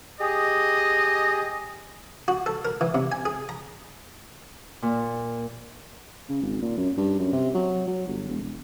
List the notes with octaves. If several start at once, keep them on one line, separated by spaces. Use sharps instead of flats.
G4 G#4 D#5
F#4
A4
A#4
E3
C3
G#5
G#4
A#5
A#2
C#3
G#1
A#2
F#2
G2
F#2
C3
F#3
F#3
G1
E1
E1